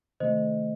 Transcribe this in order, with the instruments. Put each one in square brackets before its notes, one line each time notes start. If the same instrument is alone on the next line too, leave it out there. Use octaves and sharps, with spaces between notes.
[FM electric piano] C3 D#3 A3 [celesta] C5 D#5